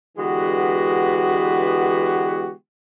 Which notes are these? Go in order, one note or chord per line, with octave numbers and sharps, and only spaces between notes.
D3 E3 G#3 B3 F#4 G4